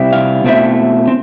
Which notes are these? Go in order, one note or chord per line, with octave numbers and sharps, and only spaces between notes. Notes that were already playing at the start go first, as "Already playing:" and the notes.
Already playing: C3 G3 C4 E4
F5
B2 A3 C4 E4
C4